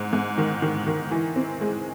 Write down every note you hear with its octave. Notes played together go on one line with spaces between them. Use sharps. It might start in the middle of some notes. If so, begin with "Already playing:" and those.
Already playing: G#2
G#2
D#3
D#3
D#3
E3
C4
G#3